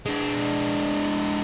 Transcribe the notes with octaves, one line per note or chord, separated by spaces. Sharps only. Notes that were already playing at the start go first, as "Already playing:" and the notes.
G#3 D4